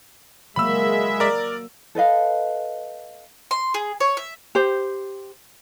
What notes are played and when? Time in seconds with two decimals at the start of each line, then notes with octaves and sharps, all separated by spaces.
0.56 F#3 G#3 A#3 E5 B5 E6
1.20 A#4 D5
1.95 A4 B4 D#5 F5
3.51 C6
3.74 G#4
4.00 C#5
4.17 E5
4.55 G4 C5